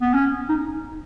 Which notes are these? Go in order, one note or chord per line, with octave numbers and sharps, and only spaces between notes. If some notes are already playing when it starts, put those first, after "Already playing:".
B3
C#4
D#4